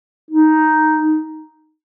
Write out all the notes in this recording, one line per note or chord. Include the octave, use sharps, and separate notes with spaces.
D#4